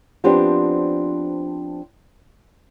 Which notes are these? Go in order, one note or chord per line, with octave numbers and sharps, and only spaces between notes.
F3 B3 C4 D4 G4